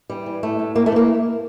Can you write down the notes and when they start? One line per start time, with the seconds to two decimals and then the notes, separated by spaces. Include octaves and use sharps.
0.10 E3 G3
0.26 E3
0.43 A2 A3
0.59 A2
0.75 A2 A#3
0.86 A3
0.92 E3 A#3